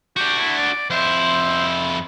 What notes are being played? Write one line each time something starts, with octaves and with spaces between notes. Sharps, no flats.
D4 F#4 G4
E4
D5
F2 E4 C5